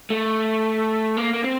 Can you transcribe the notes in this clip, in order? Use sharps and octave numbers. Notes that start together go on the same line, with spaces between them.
A3
A#3
A#3
C4